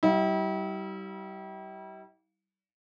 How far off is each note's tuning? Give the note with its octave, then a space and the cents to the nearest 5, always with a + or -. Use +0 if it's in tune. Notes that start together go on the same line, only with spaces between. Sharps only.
G3 -30 E4 -40 F5 +0